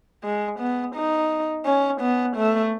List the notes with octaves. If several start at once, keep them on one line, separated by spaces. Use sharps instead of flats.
G#3
B3
D#4
C#4
B3
A3